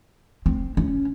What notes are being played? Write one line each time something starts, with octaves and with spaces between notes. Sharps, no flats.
C4
C#4